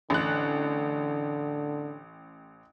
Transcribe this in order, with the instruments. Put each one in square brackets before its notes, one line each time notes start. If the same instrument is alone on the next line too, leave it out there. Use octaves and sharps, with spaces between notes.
[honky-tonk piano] A1 F#6 [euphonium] D3